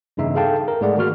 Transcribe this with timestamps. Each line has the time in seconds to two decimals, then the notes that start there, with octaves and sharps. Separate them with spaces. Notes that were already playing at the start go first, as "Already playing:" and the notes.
0.17 E2 G2 C#3 D#4 E5
0.35 G#4 A4 F5 G5 A5
0.68 A#4
0.81 G#2 G#3 A3 G#4 D5 F#5
0.97 D#3 A#3 F#4 F6